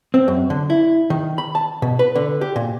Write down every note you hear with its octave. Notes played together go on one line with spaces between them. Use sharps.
C4
F#2
D3
E4
D#3
B5
A5
B2
B4
D3
G4
A#2